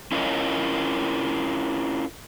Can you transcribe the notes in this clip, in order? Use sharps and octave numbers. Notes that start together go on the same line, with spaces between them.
C#4 E4 F4 A#4 C#5 D#5